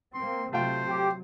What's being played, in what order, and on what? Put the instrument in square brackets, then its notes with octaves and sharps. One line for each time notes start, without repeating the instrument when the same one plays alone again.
[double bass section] A#3 C4 [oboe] C6
[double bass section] C3 F#3 [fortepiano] A3 F4 G5 [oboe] C5
[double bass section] F#3 [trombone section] G4